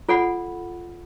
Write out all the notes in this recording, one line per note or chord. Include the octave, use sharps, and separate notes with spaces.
F4 A4 D5 F#5 B5